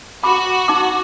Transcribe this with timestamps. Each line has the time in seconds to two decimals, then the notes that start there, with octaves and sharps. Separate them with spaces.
0.23 F#4 B5 D6
0.68 D#4 D6